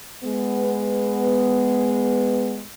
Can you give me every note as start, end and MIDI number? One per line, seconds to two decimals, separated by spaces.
0.23 2.62 56
0.23 2.62 59